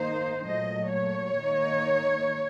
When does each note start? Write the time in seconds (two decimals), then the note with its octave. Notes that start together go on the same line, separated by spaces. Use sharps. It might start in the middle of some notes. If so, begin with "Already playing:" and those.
Already playing: D#3 A#3 D#4 C5
0.45 A#2 F#3 A3 D#5
0.91 C#5
1.37 D#3 A#3 D#4